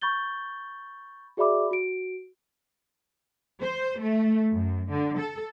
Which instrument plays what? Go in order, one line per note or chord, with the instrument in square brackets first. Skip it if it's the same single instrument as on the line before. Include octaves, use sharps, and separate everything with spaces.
[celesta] B5 C#6 G6 A6 G7
F#4 G#4 D5 E5 B5 D6
F#4 D7
[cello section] C5
A3
F#2
D3
A4